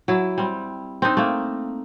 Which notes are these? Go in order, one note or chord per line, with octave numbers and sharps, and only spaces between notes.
F#3 E4
G3 C4
C4 D4 D#4
A3 A#3